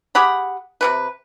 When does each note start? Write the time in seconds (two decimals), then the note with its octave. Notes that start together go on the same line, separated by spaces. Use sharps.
0.15 G4 G#4 F#5 B5
0.81 C3 G3 B4